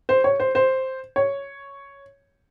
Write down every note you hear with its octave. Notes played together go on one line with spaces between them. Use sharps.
C5
C#5
C5
C5
C#5